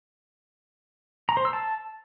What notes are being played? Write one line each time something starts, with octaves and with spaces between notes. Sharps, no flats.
A#5
C5
E6
A5